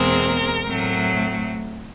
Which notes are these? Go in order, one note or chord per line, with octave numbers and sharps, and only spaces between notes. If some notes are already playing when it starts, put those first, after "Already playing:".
Already playing: E2 B2 G#3 C4 A#4
A2 F#3 A3 C4